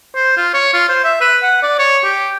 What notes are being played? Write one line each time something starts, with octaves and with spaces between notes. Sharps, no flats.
C5
F4
C#5
F4
C5
E5
B4
F#5
D5
C#5
G4